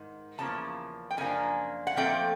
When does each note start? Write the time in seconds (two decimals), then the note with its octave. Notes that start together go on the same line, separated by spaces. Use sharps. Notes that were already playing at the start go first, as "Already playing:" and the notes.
Already playing: G#2 D#3
0.38 E2 C#3 F3 A#3 A5
1.11 G5
1.17 F#2 C#3 F3 A#3 D4 G#5
1.87 F#5
1.97 A#2 F3 A3 C4 G5